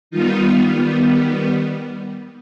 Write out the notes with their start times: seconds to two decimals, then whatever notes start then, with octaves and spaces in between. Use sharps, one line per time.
0.11 D#3 G3 B3 D#4 F4